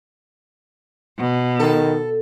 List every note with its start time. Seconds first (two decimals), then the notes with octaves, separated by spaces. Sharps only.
1.19 B2
1.59 D#3 A4